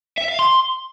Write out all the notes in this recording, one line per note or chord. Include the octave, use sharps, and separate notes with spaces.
E5
F5
C6